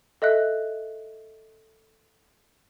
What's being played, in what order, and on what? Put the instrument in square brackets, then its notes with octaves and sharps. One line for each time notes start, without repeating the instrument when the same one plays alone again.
[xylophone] A4 D#5 E5 F#6